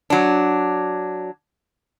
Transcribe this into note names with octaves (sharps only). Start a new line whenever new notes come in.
F#3 D4